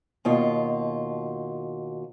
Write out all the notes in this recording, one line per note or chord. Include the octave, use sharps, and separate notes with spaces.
D#2 B2 F4